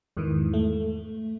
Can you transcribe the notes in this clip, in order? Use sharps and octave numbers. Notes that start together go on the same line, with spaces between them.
E2 G#2 D#3 E3
A3